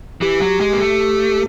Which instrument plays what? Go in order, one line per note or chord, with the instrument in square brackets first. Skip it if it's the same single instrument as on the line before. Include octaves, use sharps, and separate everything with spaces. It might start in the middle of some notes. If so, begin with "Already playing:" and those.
[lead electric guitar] E3 [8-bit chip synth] G4
[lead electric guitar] F#3
G#3
A#3
A3